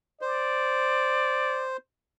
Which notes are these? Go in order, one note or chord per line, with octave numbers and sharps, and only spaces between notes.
C5 D5